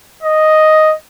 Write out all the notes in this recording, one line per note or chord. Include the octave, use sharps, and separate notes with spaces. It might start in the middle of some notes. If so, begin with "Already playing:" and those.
D#5